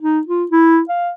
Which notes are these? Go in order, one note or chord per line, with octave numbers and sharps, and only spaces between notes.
D#4
F4
E4
F5